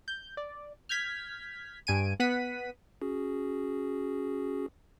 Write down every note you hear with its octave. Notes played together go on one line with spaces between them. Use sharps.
G6
D5
F6 G6 G#6 B6
G2 G#5 D7 D#7
B3 F#5 B6 D#7
C#4 F#4 G#4